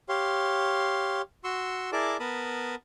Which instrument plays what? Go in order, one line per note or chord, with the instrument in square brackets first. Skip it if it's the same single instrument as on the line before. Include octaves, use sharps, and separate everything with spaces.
[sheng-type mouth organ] G4 C#5 F5 C6
F#4 C6 C#6 E6
E4 G#4 A#4 D5 A5 D6
B3 A#4 A5 B5 D#6